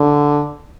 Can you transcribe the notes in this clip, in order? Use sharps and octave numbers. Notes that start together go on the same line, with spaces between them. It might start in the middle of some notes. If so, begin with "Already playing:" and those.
Already playing: D3